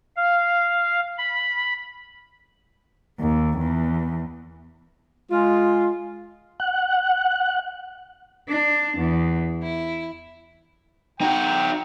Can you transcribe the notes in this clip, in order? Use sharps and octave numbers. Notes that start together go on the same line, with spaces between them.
F5
B5
D#2
E2
G#3 F4
F#5
D4
E2
E4
D#4 F#4 G5